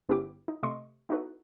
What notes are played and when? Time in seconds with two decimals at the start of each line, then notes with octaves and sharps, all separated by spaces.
0.09 G1 B3 C#4 E4 G4 D6
0.48 D#4
0.63 C3 A3 D#5 C6 C#6
1.09 B3 D#4 E4 F#4 A4 B4